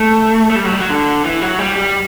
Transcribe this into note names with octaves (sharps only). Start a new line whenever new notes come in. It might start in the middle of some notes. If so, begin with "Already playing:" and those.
Already playing: A3
A3
G3
F#3
G3
F#3
D3
E3
F#3
G3
G3